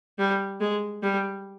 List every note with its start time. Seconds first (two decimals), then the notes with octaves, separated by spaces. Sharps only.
0.19 G3
0.61 G#3
1.03 G3